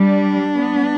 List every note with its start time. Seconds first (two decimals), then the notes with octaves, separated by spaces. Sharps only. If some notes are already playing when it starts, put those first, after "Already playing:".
Already playing: G3 D4
0.56 B3